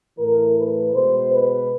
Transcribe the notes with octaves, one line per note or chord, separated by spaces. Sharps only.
A2 E3 A3 A#4
B4
B2 G#3 C5
B4